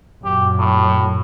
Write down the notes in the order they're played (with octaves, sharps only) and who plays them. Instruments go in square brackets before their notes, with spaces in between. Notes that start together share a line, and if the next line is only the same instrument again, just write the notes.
[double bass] F#2 A#2 [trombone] G4
[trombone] A2